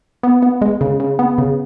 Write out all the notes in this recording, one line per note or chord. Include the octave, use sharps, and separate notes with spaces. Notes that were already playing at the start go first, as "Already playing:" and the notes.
B3
B3
G#3
C#3
C#3
B3
C#3